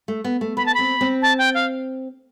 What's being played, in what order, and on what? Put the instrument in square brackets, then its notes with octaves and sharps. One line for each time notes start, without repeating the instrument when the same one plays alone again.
[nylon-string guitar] A3
B3
A3
[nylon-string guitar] B3 [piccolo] B5
[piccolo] A5
[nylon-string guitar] C4 [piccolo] B5
[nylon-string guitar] C4
[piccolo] A5
G5
F5